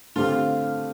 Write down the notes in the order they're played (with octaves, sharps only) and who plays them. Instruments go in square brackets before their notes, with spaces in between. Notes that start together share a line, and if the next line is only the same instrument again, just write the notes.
[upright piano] D3 A3 C4 G4 [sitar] F4